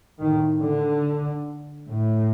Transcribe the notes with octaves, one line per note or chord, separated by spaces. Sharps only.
A2 D#3
D3
A2